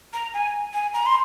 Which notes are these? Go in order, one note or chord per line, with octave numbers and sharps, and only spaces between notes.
A#5
G#5
G#5
A#5
C6